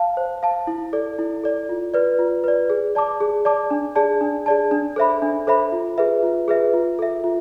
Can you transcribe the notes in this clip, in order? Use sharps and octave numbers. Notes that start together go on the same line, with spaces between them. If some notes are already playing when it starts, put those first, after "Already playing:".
Already playing: F5 A5
C5
F5 A5
E4
A4 D5
E4
A4 D5
F4
B4 D5
F4
B4 D5
G#4
D5 A5 D6
G#4
D5 A5 D6
D4
G#4 D5 A5
D4
G#4 D5 A5
D4
A4 C5 E5 B5
D4
A4 C5 E5 B5
F4
G#4 B4 E5
F4
G#4 B4 E5
F4
A4 E5
F4